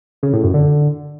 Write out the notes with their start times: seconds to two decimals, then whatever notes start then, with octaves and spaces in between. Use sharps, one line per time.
0.23 C#3
0.33 A2
0.43 F#2
0.54 D3